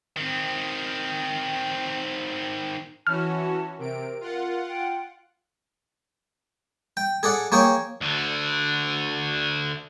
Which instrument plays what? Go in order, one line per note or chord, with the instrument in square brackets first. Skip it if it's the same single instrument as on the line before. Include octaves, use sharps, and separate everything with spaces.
[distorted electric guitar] D#3 C4
[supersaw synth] E3 C#4 F#4 [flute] A5 [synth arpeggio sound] F6
[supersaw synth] C3 D7 [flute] A#4
[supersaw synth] F4 F#5
[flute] G5
[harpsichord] G5
G#4 A4 D5 F#5
A#3 G#4 C#5 G5
[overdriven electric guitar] D2 D3